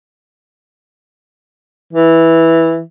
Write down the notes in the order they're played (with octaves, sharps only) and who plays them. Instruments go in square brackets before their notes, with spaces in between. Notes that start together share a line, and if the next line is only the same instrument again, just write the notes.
[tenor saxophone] E3